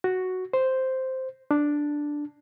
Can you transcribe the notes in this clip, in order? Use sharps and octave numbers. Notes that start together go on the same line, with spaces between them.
F#4
C5
D4